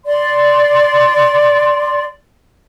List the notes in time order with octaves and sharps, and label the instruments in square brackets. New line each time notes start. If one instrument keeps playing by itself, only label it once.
[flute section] D5 C6